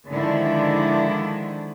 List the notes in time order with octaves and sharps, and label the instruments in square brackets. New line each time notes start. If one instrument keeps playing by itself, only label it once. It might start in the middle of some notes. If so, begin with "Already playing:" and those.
[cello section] D3 D#3 F3 G#3 D4 E4